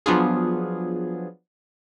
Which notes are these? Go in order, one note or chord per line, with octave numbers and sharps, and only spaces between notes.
F3 F#3 B3 D4 F4 G#4